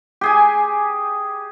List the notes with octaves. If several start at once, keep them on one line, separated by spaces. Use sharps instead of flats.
G4 G#4 G#5